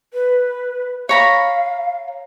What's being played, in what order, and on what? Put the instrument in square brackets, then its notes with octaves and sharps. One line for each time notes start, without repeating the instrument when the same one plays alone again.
[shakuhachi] B4
[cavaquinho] C#5 A#5 B5 [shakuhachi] F5